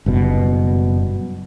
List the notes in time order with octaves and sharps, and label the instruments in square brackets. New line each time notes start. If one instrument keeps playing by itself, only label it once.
[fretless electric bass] F#1 G2 B2